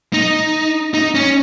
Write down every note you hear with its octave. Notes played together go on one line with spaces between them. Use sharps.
D#4
D#4
C#4